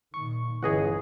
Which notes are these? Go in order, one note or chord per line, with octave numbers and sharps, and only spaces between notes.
A#2 D#3 C#6
G1 C#2 D3 E3 G#4 D#5 F#5